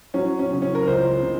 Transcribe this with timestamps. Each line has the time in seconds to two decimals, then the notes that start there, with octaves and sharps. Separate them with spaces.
0.14 F#3 C#4
0.39 C#4
0.51 C#3
0.62 C#4
0.75 A#4
0.87 C#2 C5
1.23 C#3